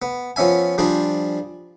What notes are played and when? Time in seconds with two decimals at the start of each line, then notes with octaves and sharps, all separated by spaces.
0.02 B3
0.36 F3 B3 C#4 E5 G#5
0.78 F3 G3 D4 G#4 C5